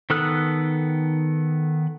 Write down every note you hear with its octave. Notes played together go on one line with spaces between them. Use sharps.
D#3 B3 A4 D#6 F#6